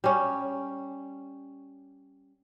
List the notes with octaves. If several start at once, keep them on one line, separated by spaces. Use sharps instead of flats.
G3 C#4